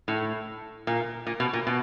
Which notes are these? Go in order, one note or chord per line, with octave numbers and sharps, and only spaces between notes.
A2
A#2
A#2
B2
A#2
B2